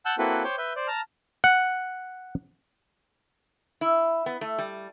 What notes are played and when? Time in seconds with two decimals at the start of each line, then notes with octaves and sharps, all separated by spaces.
0.06 F#5 A5 E6 F#6 G6
0.18 A#3 C4 E4 F#4 A4 B4
0.44 C5 C#5 G5 D6
0.58 B4 E5 G6
0.76 C5 D5
0.88 A5 A#5 F6
1.44 F#5
3.81 E4
4.26 B3
4.41 A3
4.58 G3